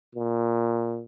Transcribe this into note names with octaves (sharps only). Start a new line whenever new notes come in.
A#2